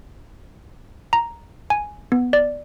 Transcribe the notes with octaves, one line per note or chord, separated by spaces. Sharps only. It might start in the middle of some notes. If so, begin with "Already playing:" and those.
A#5
G#5
B3
D5